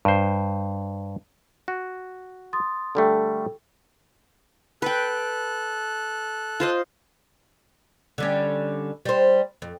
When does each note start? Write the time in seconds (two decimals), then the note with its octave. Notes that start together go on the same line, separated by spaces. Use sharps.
0.05 G2 C5
1.68 F#4
2.53 C6 D#6 A6
2.95 D3 G3 A3 A4 G5
4.82 A4 B4 G5 F#6
6.60 F4 C5 D#5
8.18 D3 G3 C#4
9.05 G3 C5
9.62 F2